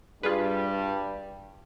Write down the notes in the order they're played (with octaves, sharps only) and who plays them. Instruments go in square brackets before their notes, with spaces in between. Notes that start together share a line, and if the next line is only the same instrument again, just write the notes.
[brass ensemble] G2 G3 [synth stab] F4 G#4 B4